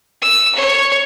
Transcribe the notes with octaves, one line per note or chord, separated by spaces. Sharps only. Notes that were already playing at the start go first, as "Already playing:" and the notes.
E6
C#5